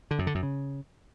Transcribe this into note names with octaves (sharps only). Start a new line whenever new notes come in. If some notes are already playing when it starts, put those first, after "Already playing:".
D3
F#2
D3
F#2
C#3